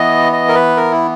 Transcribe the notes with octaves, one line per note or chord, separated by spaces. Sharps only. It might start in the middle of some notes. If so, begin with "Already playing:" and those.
Already playing: E3 B3 D#5
D#5
A#4
B4
A#4
E4